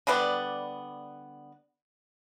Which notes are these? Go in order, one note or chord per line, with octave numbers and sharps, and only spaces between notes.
D3 G3 B3 D5